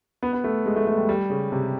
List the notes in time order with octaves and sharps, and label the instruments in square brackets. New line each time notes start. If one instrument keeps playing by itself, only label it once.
[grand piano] B3
B3
A3
G#3
A3
A3
G3
G3
C#3
C3